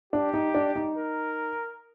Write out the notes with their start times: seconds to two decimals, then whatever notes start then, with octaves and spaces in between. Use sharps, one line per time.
0.13 D4 G4
0.34 D#4
0.54 D4
0.76 D#4
0.97 A#4